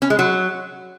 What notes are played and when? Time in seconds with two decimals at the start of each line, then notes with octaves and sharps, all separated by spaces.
0.02 C#4
0.10 G#3
0.19 F#3